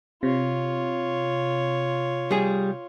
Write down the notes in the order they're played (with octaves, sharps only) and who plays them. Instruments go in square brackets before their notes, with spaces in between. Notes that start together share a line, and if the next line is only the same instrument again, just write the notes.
[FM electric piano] C3 [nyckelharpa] F4 C#5
[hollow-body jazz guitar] G3 G#4